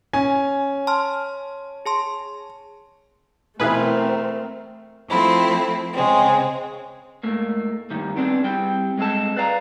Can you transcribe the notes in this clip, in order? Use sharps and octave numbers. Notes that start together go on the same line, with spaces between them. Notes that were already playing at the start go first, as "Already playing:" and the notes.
C#4 G#5
A5 C6 F6
G#4 A5 C6
B2 E3 A3 C4 G#4 A#4 B4 E5
F3 A3 C4 E4
C#3 G#3 C4
G#2 A3 A#3
G2 D#3 G3
B3 C4 D4 D#4 F4 G#4
G3 C4 G4 G5
G2 G#3 C4 A4 A5
B4 D5 F5 A5 A#5